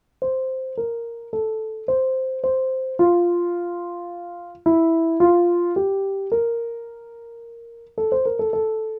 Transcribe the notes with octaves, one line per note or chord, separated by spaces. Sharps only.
C5
A#4
A4
C5
C5
F4
E4
F4
G4
A#4
A4
C5
A#4
A4
A4